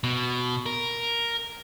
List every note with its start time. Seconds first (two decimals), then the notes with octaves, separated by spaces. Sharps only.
0.04 B2
0.66 A#4